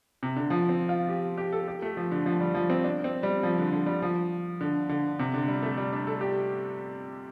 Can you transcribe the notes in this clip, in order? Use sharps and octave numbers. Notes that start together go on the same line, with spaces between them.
C3
D3
F3
C4
F4
G4
G4
A4
G4
A3
F3
D3
F3
G3
F3
C4
D4
C4
G3
F3
D3
D3
G3
F3
D3
D3
C3
D3
G3
A3
G3
D4
A4
G4